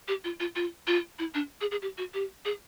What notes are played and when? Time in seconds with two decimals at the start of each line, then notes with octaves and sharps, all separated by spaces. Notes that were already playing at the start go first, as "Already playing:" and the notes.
0.08 G4
0.24 F4
0.40 F4
0.56 F4
0.87 F4
1.19 E4
1.34 D4
1.61 G#4
1.71 G#4
1.82 G4
1.98 F#4
2.14 G4
2.45 G#4